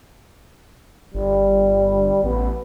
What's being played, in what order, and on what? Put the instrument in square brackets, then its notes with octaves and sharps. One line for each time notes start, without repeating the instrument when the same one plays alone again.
[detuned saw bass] G1 [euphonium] G3
[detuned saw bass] A1 [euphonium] B3